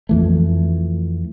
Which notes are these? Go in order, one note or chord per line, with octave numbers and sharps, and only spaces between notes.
F2 E3 A3